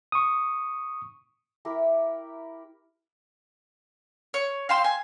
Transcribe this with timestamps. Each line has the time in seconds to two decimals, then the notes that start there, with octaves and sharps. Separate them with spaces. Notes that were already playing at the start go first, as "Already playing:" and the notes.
0.12 C#6 D#6
1.65 E4 G4 A#4
4.34 C#5
4.69 F5 G5 C6 E6
4.84 G#5